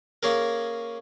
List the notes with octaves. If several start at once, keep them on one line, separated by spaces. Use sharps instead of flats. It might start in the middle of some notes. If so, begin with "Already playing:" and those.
A#3 C#4 G#4 A#4